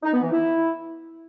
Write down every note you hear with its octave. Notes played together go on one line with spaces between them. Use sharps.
D#4
B3
E3
E4